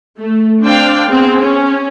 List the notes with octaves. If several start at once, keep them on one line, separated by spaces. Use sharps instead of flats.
A3
C4 D4 C5 D5 F5 G5
B3 C4 G#4
C#4